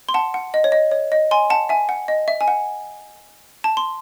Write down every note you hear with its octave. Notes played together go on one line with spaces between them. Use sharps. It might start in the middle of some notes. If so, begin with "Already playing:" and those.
C6
F#5 A5
F#5
D#5
C#5
D#5
C#5
D#5
G#5 C6
F#5 A5
E5 G#5
F#5
D#5
E5
G#5
F#5
A5
C6